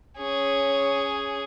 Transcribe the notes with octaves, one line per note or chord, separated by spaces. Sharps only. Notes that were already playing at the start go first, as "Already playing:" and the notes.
C#4 G#4